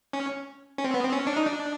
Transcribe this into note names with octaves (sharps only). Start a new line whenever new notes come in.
C#4
C#4
C4
B3
C4
C#4
D4
D#4
D4